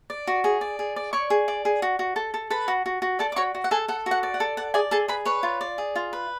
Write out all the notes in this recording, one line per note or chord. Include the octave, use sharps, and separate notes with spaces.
D5
F#4
G#4
D5
G#4
D5
C#5 D5 C#6
G#4
D5
G#4
F#4
F#4
A4
A4
A4 B4 B5
F#4
F#4
F#4
A4 D5 A5
D6
F#4 C#5 C#6
F#4
F#5
G#4 A4 G#5
A4 F#5
F#4
F#5
D5
F#5
A4
D5 F#5
G#4 D5 G#5
G#4 A4 A5
G#4 B4 B5
B4 C#5 C#6
F4
D5
G#4
F4
B4